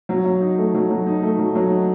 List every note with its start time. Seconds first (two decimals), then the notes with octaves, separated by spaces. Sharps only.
0.09 F#3
0.25 F#3
0.41 D#4
0.58 A3
0.74 F#3
0.90 F#3
1.07 D#4
1.23 A3
1.39 F#3
1.55 F#3
1.72 D#4